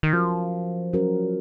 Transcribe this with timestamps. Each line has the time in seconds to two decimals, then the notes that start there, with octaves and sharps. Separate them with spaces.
0.03 D#3
0.13 F3 F#3 C#4 F#4 A#4
0.93 F#3 C#4 F#4 A#4